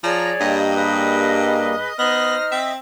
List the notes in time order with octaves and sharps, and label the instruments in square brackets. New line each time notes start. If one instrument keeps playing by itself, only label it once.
[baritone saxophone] F3 [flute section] G#4 C#5 D5 [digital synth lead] A#5
[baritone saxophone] G2 [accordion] G3 A#3 [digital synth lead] D#5
[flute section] G#4 B4
[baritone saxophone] B3 [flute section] D#4 C5 F6 [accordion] D#5 [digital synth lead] A#6
[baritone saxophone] C4 [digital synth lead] E5